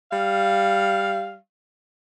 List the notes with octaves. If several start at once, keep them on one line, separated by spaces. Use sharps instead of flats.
G3 F5